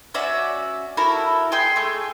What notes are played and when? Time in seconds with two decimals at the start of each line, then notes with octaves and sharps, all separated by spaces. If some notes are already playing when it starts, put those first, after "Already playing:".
0.14 C#4 F#4 D5 E5
0.97 E4 F#4 A4 A#4
1.52 G#4 G5 C6 G6
1.76 A3 G#4